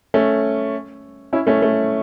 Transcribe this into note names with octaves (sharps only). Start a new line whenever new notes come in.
A3 C#4
C#4 E4
A3 C#4
A3